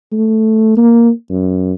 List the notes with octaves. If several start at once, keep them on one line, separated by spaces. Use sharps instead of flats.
A3
A#3
F#2